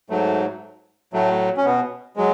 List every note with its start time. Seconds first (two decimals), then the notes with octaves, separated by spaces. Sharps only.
0.10 G#2 F#3 A3
1.13 A2 F#3 A3
1.57 C#4
1.65 B2 B3
2.16 F#3 G#3